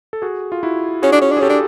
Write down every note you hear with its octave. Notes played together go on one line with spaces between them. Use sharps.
A4
F#4 G#4
F4
E4 F#4
C#4 F#4 G#4
D4
C#4
D4
G#4
C#4 G4 A4
D4